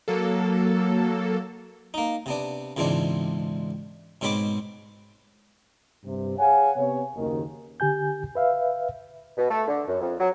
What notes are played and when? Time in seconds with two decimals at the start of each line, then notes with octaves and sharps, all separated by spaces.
0.08 F#3 A#3 A4
1.94 A#3 D#4
2.26 C3 B3 D4
2.77 C#2 G#2 B2 E3 C4 D4
4.21 G#2 B2 C4 C#5 B5 D6
6.05 G2 C3
6.39 G#4 C#5 F5 F#5 G#5
6.77 C3 B3 C#5
7.16 F#1 D#2 D#3
7.80 D3 G4 G#5 G6
8.35 B4 E5 F5
9.37 B2
9.50 A3
9.68 D3
9.87 F#2
10.01 F2
10.20 F#3